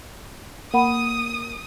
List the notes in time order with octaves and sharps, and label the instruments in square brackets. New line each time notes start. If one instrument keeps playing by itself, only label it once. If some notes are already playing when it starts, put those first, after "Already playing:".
[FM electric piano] A#3 [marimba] F#5 B5 [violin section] D#6